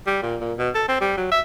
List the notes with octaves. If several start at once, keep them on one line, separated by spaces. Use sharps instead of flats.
G3
A#2
A#2
B2
A4
C4
G3
F#3
E5